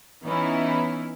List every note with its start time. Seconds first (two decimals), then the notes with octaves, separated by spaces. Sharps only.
0.25 E3 B3 C#4 D#4 E4